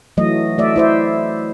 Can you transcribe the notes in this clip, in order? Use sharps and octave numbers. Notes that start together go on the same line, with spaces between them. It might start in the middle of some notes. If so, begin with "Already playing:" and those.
E3 F#3 A3 D#5
A3 D5 E5
E4 C5 E5